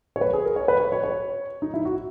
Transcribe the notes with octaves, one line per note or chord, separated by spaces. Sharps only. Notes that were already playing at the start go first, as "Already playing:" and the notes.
C#5
B4
G#4
A#4
C#5
B4
C#5
C#5
C#5
D#4
E4
F#4